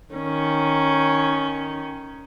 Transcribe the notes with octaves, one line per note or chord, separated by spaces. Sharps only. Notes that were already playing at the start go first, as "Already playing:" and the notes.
D#3 C#4